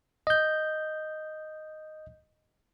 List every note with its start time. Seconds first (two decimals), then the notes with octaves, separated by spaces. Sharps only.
0.27 D#5 G6